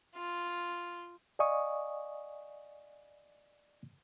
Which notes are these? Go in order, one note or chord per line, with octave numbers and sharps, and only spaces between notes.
F4
D5 D#5 F5 G#5 C#6 D#6